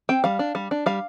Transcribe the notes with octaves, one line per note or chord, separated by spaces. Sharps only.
C4 G5
G3 F5
D4
G3
D4
G3 F5